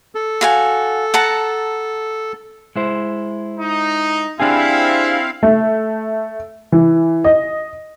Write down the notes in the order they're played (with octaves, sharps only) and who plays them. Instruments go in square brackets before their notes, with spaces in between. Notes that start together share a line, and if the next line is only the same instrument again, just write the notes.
[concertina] A4
[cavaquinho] F#4 F5 G#5
F#5 A5 A#5
[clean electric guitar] G#3 E4 C5
[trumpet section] D#4
[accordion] C4 F5 [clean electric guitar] D4 G4 G#4 [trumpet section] E4
[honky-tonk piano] A3
E3
D#5